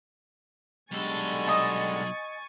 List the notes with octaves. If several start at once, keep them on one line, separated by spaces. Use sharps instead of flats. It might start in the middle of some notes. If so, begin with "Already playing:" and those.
B1 D3 G3 G#3 A4 G#5 C#6 A6
D#5 A5